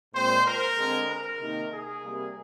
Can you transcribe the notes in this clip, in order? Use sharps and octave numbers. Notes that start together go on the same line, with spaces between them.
A#2 G#3 C4 C5
A#4
D3 G#3 C4
A#4
C3 D#3 A#3
G#4
C3 G3 A#3